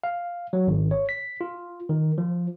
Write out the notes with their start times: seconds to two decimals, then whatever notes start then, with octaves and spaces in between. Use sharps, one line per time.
0.04 F5
0.53 F#3
0.67 G#1
0.91 C#5
1.09 B6
1.41 F4
1.89 D#3
2.18 F3